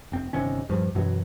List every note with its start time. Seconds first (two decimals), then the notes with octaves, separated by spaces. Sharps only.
0.12 F1 C4
0.33 G1 C3 D#3 C#4
0.69 D#1 G2 F3
0.95 F#2 B2 E3 F#3